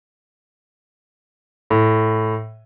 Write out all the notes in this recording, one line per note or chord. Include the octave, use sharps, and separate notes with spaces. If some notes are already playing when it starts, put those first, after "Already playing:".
A2